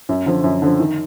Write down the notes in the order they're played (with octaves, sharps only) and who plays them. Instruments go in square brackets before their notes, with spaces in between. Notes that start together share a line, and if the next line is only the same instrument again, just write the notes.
[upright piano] F#2
D3 F3
F#2
D3 F3
D#3